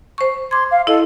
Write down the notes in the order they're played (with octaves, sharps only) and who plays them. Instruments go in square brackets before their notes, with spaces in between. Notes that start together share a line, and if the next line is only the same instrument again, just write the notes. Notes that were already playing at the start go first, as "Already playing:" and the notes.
[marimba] C5 C#6
[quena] C6 [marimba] D6 G#6
[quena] F5
[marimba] E4 D#5 [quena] A4